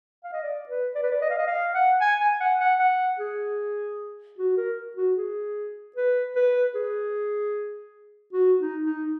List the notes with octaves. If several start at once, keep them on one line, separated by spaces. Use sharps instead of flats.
F5
D#5
D5
B4
D5
B4
D5
D#5
F5
D#5
F5
F#5
G#5
G#5
F#5
F#5
F#5
G#4
F#4
A#4
F#4
G#4
B4
B4
G#4
F#4
D#4
D#4